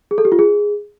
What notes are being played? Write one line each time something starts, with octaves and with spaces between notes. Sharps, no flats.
G#4
A4
G4
F4
G#4